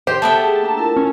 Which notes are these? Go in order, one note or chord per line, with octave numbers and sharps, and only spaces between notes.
G4 C5
A3 B3 G5 A5
G#4
A#3 D4 A#5
E4 F4 A#4
C#4